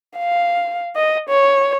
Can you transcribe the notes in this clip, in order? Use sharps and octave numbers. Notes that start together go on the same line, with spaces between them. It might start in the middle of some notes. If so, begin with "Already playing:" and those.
F5
D#5
C#5